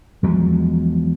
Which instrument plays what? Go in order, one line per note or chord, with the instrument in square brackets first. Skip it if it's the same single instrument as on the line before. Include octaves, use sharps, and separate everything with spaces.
[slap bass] E2 F3 F#3 G#3